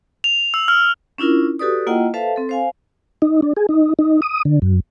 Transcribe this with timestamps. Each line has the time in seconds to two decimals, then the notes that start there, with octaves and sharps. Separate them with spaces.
0.24 F7
0.54 E6
0.68 F6
1.18 C#4 D4 E4 F4 A#4
1.59 F#4 G4 A4 B4 D5 D#6
1.87 A#3 E4 F4 D#5 F#5 G5
2.14 A4 B4 C5 E5 F5 A5
2.36 C4 A4
2.49 C5 F5 G#5
3.22 D#4
3.42 D4
3.57 G#4
3.69 D#4
3.99 D#4
4.22 D#6
4.45 D3
4.62 F#2